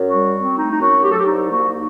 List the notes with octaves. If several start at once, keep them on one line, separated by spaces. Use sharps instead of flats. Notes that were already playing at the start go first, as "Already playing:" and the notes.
Already playing: F#2
G3 F#4
C4
A3 D#4
D#4
F#2 F#4
F#3 G4
A4
G4
C2 D#4
A#3 F#4
D#4